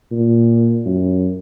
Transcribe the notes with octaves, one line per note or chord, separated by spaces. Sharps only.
A#2
F#2